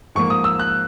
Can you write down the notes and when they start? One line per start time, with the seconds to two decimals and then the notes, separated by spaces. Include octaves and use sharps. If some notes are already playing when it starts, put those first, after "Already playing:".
0.15 G#2 F3 A#3 C#6
0.30 D#6
0.44 E6
0.59 F#6